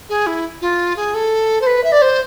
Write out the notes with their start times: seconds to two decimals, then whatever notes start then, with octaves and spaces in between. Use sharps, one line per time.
0.09 G#4
0.26 E4
0.61 F4
0.96 G#4
1.14 A4
1.61 C5
1.66 B4
1.83 E5
1.92 D5
2.02 C5